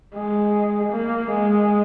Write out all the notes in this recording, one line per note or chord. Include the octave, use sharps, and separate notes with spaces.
G#3
A#3
G#3